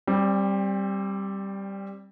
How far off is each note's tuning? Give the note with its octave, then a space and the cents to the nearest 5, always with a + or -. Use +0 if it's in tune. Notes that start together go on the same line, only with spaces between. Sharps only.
G3 +0 C4 +25